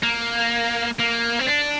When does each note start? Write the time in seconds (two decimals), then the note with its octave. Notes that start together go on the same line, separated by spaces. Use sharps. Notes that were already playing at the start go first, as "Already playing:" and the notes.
0.03 A#3
0.99 A#3
1.39 C4
1.47 D4